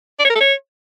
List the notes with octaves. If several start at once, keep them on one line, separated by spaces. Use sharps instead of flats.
D5
C#5
A#4
A4
C#5